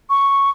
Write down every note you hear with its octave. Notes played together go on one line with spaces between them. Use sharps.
C#6